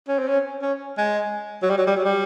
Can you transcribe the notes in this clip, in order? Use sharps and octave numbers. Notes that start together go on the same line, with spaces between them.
C#4
C4
C#4
C#4
G#3
F#3
G3
F#3
G3
F#3
G3